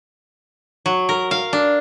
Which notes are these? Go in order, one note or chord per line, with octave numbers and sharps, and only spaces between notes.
F#3
A#4
F5
D4